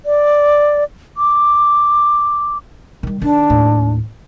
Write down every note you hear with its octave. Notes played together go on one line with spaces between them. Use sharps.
D5
D6
D#3 G3
D#3 D4
D#2 A2